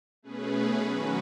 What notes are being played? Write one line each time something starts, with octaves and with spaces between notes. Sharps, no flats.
B2 A3 C#4 G#4 B4
D#3 F#3 C#4 F#4 B4